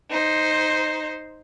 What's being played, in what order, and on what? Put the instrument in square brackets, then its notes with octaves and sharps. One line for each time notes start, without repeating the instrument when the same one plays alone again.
[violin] D#4 C5